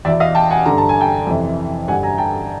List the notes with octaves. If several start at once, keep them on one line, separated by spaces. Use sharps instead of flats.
E2 B2 D5 E5
D#5 F5
G5 A5
F#5 G#5
G2 D3 A#5
A5
G#5
G5 A5
F2 C3 E3
G2 D3 F#5 G#5
G#5 A#5
G5 A5